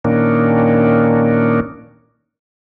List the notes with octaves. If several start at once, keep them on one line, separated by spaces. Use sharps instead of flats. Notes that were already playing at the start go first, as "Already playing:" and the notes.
A#2 D#3 A#3 C#4 D4